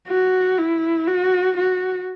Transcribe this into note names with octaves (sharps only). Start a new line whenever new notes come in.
F#4
E4
F#4
F#4